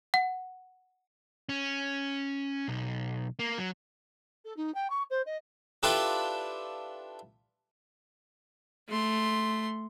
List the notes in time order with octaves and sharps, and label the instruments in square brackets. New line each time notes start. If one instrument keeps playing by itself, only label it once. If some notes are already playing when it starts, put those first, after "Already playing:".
[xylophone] F#5
[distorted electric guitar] C#4
B1
A#3
F#3
[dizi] A4
D#4
G5
C#6
C5
D#5
[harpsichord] D4 E4 F4 G4 A4 B4
[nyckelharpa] A3 C6